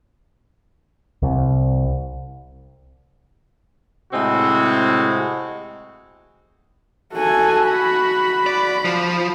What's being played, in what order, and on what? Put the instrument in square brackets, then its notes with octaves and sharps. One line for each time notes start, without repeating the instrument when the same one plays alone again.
[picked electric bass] C2
[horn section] A2 C3 G#3 C4 F#4
[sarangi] F#4 [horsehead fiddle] A4 G#5
[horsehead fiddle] B5
[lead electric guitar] D5
F3